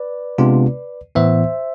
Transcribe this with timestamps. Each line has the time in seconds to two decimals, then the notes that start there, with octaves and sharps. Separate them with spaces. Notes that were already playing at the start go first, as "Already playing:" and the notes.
Already playing: B4 D5
0.38 C3 G#3 B3 D4 F4
1.15 A2 E3 B3 C5 E5